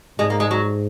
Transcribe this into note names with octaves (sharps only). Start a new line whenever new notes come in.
G#2 G#3
A#3
G#3
F#3